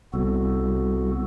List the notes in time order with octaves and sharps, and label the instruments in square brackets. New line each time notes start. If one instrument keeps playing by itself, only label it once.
[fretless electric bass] C2 [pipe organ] B3 F#4 A4